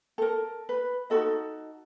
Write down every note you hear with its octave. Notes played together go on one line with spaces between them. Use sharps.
A4 A#4
B4
D#4 F#4 A4 D#5